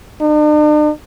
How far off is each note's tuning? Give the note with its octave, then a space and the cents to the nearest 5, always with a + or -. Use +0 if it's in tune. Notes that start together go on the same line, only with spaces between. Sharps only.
D4 +45